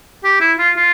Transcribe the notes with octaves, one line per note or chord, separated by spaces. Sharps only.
G4
E4
F4
F4